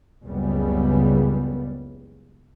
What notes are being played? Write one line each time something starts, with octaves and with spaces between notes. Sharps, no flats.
F#1 C#2 C#3 G3 B3